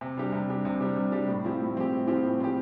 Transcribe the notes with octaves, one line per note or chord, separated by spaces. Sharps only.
C3
G3 D4 G4
C3
G3 D4 G4
C3
G3 D4 G4
C3
G3 D4 G4
A2
F3 C4 E4 G4
A2
F3 C4 E4 G4
A2
F3 C4 E4 G4
A2
F3 C4 E4 G4